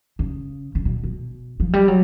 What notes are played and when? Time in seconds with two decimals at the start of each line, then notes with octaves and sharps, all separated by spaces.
0.19 C#3
0.75 C#3
0.85 B2
1.04 B2
1.60 F3
1.73 G3
1.88 F#3